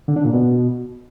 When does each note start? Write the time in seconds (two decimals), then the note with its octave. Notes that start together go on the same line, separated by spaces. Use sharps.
0.08 D3
0.16 D4
0.25 A#2
0.33 B2